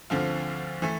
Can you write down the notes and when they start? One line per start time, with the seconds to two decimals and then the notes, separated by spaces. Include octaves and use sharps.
0.10 D2 D3 F3 C4 F4
0.82 E3 A3